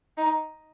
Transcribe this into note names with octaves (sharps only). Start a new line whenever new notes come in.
D#4